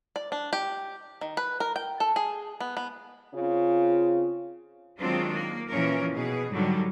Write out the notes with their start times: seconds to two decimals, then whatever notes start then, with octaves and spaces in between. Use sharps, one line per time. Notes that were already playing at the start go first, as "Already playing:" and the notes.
0.16 D5
0.32 D4
0.53 G4
1.21 D#3
1.37 B4
1.60 A#4
1.76 G5
2.00 A4
2.16 G#4
2.61 B3
2.77 B3
3.35 C#3 C4 C#4 F4
4.99 D#3 F#3 G#3 C4 D4 F4
5.32 A#3
5.69 A#2 E3 F3 C#4 A#4
6.13 B2 G#4
6.52 G#2 D3 D#3 F#3 G3